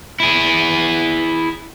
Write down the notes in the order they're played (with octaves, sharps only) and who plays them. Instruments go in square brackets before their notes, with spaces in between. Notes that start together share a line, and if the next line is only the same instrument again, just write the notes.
[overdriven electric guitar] E4 G#4